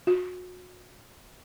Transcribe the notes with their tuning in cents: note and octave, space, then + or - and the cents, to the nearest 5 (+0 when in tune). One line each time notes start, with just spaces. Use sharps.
F#4 -30